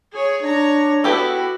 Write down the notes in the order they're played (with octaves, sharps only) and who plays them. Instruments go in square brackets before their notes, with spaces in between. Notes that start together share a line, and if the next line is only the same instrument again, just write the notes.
[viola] G#4 C#5
[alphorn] D4 [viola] C#5 A#5
[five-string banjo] B3 G4 A4 [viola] E4 F#4